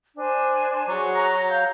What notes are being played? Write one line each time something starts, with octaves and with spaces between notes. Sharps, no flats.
D4 C5 G#5
F#3 F#4 G#4 C#6
A#5
F5 G6